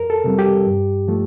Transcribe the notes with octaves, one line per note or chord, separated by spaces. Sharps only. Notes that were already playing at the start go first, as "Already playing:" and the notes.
Already playing: F2 A#4
A4
C3 G3 C4
G4
G2
F3 A3